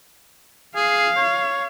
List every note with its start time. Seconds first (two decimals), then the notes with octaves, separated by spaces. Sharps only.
0.76 G#4 F5
1.17 C#5